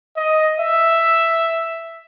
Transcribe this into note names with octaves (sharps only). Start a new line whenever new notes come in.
D#5
E5